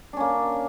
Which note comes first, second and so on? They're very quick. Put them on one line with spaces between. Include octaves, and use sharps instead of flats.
D4 C#4 A#3